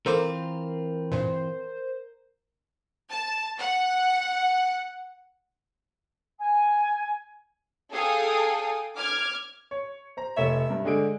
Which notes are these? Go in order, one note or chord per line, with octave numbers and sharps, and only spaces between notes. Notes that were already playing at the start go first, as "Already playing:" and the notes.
E3 C4 F4 A4 A#4 C5 D6
G2 A#2 C5
A5
F#5
G#5
G#4 A4 F5 G5 G#5 D#6
D6 F6 G#6
C#5
C5 A#5
F1 C#5 E5
G2
D3 G#3 G#4 D7